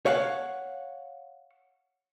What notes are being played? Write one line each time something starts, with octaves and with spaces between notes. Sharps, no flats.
C#5 F5 F#5